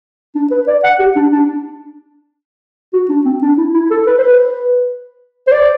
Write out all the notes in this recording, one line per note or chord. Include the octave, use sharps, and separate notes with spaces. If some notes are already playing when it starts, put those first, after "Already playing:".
D4
B4
D5
F#5
G4
D4
D4
F#4
D4
C4
D4
E4
E4
A4
B4
C5
B4
C5
D5